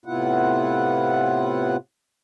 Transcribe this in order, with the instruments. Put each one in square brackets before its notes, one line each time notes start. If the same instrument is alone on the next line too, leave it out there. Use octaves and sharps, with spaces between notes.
[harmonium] A2 C3 B3 E4 F4 F#5